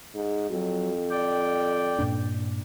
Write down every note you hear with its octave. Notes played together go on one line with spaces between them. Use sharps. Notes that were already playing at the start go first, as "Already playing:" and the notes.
G#2
F2 F#3
D5 G5
G2 A#2 D4